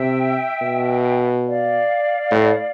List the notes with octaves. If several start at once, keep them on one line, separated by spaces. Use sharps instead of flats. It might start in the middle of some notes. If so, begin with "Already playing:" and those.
Already playing: C3 E5 G5
B2
D5 F5
A2